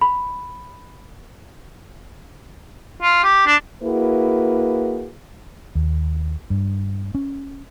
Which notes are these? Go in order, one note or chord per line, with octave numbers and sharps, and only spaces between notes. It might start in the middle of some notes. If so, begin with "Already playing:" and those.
B5
F4
G4
D4
A#3 E4 F#4 G#4 B4
D#2
G2
C#4